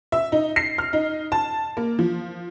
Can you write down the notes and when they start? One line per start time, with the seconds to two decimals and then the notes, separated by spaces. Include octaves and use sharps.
0.12 E5
0.32 D#4
0.56 C7
0.78 F6
0.93 D#4
1.32 A5
1.77 A#3
1.99 F3